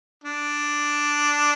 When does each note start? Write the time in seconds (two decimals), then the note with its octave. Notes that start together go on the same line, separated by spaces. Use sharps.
0.24 D4